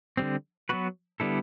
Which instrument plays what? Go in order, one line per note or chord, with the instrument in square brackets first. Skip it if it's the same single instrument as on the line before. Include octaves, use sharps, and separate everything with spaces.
[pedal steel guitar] D3 G3 C4
F#3 B3 F#4 B4
D3 G3 B3 E4 A4